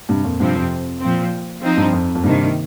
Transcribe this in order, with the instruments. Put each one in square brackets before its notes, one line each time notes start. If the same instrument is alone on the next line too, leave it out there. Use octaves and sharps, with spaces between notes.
[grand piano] G2 C3
F2 A#2
[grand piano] G2 [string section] C3 F3 C4
[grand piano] F2
[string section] A#2 F3 C4
F3 C4 D#4
[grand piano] G2
F2
F2
[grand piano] G2 [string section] C3 D#3 A#3